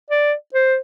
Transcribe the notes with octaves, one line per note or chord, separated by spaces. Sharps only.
D5
C5